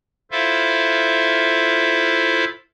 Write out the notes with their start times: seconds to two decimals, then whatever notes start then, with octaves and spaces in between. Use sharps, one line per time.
0.31 E4 F4 A4 C5 E5 F5